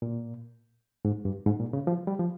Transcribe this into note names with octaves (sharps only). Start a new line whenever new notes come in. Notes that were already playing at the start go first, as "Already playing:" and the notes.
A#2
G#2
G2
G#2
A#2
C#3
F3
G3
F3